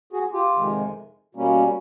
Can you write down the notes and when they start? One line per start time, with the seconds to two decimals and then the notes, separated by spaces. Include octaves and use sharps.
0.13 F#4 G#4
0.33 F4 G4
0.53 F2 C3 D#3 G#3
1.35 B2 G3 A#3 C#4